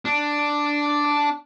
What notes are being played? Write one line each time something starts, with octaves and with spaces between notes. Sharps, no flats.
D4